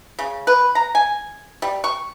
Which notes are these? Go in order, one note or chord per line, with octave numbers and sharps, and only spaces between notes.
C#3
B4
A#5
G#5
G3
C#6